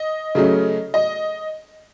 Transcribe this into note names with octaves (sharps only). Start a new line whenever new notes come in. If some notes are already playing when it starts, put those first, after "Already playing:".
Already playing: D#5
C#3 F#3 A3 C#4
D#5